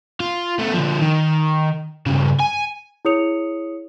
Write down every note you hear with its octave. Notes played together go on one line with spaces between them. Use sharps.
F4
A3 B3
D3 F3
D#3
G2 C#3
G#5
E4 G#4 C#5 D#6 C#7 F7